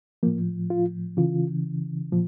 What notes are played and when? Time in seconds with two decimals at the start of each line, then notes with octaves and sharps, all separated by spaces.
0.23 A2 F3 A#3
0.70 F4
1.17 C#3 E3 F4
2.12 A#2 F3